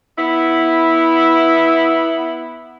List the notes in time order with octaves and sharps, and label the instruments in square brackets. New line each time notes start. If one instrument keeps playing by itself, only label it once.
[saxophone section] B3 E4